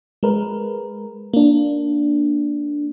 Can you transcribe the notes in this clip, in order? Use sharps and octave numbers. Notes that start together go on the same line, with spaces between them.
G#3 A#4 B4
A#3 D4